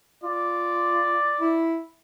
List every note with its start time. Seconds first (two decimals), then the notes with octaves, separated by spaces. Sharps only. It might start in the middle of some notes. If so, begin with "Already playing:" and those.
0.23 F4 D5
1.40 E4